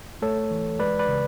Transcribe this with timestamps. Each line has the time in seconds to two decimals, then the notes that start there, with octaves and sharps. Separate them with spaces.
0.22 A3 A4 C#5
0.51 E3
0.79 G#3 B4 D5
0.99 B4 D5
1.08 C#3